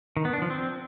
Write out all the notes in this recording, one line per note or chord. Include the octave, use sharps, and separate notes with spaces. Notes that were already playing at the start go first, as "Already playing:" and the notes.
D#3
B3
D4
F3
C4